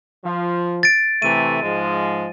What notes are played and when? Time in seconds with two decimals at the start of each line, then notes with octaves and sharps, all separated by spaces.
0.25 F3
0.83 A6 D7
1.22 C3 E3 A3 D#7
1.62 G#2 F3 G#3